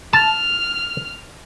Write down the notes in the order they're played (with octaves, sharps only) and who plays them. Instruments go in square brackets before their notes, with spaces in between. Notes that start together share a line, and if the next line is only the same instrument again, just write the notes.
[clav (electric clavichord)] A5 [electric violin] F6